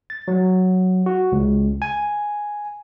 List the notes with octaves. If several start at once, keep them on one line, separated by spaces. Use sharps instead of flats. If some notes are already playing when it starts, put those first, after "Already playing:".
A6
F#3
F#4
C#2
G#5